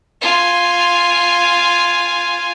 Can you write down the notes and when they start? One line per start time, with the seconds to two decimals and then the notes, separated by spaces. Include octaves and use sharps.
0.22 F4 G#5